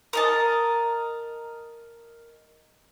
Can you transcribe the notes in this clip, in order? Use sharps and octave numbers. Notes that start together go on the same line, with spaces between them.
A#4 D#5 A5